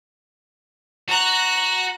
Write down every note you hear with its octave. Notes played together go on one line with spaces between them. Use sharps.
F#4 A#5 F#6